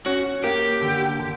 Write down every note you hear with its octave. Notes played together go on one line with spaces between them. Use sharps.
C#4 F#4
A#3 G4
D3
D3